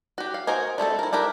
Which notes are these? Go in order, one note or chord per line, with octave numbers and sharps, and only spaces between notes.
F#4 G4
F5
F#4 A#4 C5 D#5 G#5
G3 A3 C4 A4
E4 A#4
D4 E4 G4 A#4